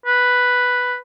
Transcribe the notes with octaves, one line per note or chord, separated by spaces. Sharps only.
B4